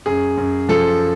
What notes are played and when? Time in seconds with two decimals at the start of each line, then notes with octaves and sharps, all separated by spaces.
0.06 F#2 G#4
0.37 F#2
0.69 F3 A4